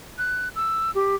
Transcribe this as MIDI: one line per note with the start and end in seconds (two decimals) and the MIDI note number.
0.18 0.48 90
0.55 0.91 88
0.95 1.16 67